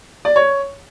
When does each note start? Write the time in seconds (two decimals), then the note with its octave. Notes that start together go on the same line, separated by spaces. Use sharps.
0.25 D5
0.36 C#5